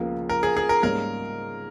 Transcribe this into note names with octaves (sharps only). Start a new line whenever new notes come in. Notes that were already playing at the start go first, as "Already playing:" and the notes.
Already playing: C#2 C#3 F3 A#3
A#4
G#4
G#4
A#4
G#2 G3 A#3 C#4 A#4